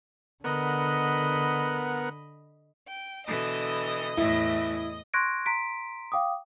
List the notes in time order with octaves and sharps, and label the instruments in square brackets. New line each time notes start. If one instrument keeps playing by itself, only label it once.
[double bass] D3 [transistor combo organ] B3 A#4 F#5 [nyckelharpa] D#5 B5
[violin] G5
[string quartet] B2 D3 E3 [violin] D#5 D#6
[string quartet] E2 A2 E3 [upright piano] E4
[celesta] C6 C#6 F#6 G#6 A#6 D7
A#5 C6 B6 D7
F5 G5 D6 D#6